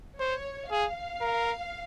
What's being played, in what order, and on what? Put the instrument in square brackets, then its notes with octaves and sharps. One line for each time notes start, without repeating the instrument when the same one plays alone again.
[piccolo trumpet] C5 [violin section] C#5
[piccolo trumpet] G#4 [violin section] F5
[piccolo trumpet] A#4